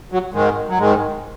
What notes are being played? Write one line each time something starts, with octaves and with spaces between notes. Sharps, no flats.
F#3
G#2 D#3 G#3
F#3
G#2 D#3 G#3